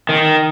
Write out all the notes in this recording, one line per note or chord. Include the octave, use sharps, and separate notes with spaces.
D#3